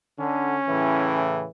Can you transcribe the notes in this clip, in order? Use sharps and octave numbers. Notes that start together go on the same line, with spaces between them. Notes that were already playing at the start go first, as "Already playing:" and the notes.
D3 C#4
A2 C#3 E3